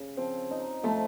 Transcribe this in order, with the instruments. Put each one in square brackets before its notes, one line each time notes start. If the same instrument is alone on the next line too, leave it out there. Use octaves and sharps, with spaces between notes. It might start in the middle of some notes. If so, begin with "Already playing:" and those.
Already playing: [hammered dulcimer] C#3
[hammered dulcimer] F3 [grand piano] C4
[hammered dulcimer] D#4
[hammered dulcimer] F3 [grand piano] A3